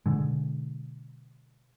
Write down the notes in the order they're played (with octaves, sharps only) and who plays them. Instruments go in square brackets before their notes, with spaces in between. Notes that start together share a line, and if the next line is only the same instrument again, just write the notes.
[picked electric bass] B2 D3 G#3